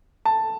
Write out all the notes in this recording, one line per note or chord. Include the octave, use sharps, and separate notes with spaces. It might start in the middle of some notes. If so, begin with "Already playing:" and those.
A5